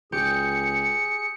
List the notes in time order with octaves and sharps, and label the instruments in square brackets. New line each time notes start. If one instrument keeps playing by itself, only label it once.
[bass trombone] C#2 [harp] G4 [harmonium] G#4 [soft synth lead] C#7